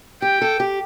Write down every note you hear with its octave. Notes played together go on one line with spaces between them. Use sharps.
G4 G5
A4
G4